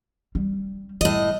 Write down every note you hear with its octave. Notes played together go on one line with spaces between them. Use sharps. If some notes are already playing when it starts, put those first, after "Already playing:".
G3
A2 G3 D#5